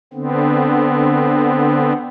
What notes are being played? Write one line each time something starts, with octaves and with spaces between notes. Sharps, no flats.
D3 B3 C4